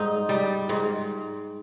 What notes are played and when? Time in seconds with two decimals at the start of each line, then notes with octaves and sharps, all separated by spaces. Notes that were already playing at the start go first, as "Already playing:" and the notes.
Already playing: G#2 G3 D#4
0.29 G3
0.69 G#2